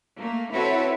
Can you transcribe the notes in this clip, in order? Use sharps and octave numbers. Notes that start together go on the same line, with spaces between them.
A3 A#3
C4 E4 F#4 A4 B4 C#5